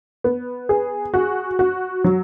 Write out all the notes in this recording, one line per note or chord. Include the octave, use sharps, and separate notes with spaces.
B3
G#4
F#4
F#4
F#3